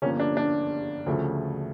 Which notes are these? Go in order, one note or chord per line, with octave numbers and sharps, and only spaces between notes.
G1 G2 F3 A#3 C#4
D4
D4
D2 C#3 F3 A3